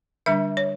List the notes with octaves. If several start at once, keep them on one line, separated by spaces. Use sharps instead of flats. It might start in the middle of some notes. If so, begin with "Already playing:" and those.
D3 G3 D4 E5
C#5